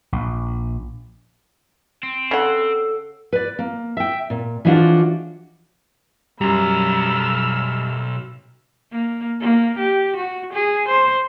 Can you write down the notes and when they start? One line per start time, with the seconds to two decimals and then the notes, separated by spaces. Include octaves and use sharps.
0.13 A#1
2.03 C4
2.31 C#3 A4 F#5
3.33 B4 D5
3.59 A#3
3.97 E5 G5
4.30 A#2
4.65 E3 F3 G#3 D4 F4 F#4
6.41 B1 F#2 G3 A#5 B5 E6 F6
8.91 A#3
9.40 A#3
9.78 G4
10.16 F#4
10.53 G#4
10.88 C5